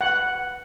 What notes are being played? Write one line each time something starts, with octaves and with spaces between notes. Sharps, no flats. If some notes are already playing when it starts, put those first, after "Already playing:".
F#5